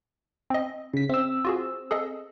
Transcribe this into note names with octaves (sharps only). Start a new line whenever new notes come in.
C4 D#5
C#3 B6
C4 E5 E6
F4 F#4 G#4
G#4 A4 D#5